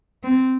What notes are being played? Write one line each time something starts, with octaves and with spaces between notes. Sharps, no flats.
C4